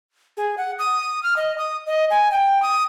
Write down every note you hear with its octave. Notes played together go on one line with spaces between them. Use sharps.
G#4
F#5
D#6
F6
D#5
D#6
D#5
G#5
G5
D#6